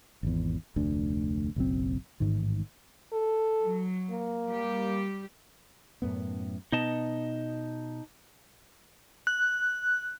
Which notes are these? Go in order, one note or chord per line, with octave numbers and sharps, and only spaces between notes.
G#1 E2
F1 D2 D3
F#1 B1 F#3 C4
A1 G#2 D#3
A4
F#3
A#3
G3 G4
F#2 A2 B3
B2 B3 D#4 D#5 A5
F#6